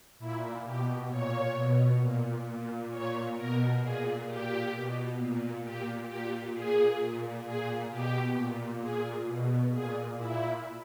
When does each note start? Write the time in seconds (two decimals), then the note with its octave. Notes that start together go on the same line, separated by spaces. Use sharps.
0.19 A#2 E4
0.63 B2 G4
1.09 A#2 C#5
1.54 B2
1.99 A#2
2.45 A#2
2.90 A#2 C#5
3.36 B2 A#4
3.81 A#2 G#4
4.26 A#2 G4
4.73 B2
5.17 A#2
5.63 A#2 G4
6.08 A#2 G4
6.53 A#2 G#4
6.98 A#2
7.44 A#2 G#4
7.89 B2 G4
8.35 A#2
8.80 A#2 G#4
9.25 B2
9.71 A#2 G#4
10.16 A#2 E4